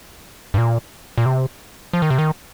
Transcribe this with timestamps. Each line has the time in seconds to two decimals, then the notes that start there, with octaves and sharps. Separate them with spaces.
0.54 G2
0.58 A#2
1.18 A#2
1.26 C3
1.93 F3
2.02 D#3
2.10 C3
2.18 D#3